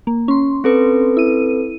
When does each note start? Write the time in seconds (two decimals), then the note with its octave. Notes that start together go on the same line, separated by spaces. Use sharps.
0.07 A#3
0.28 C#4 C6
0.64 C4 A4 B4
1.17 E4 D#7